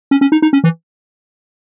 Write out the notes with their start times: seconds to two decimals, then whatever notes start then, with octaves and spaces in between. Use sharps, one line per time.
0.11 C#4
0.21 C#4
0.32 D#4
0.42 D#4
0.53 C#4
0.64 E3